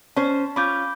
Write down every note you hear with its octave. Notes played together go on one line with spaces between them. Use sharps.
C#4 C5 A5
C#4 F4 B5 D6 G6